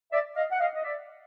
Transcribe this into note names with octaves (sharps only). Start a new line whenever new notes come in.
D5 E5
D#5 F5
F#5
D#5 F5
D#5
D5 E5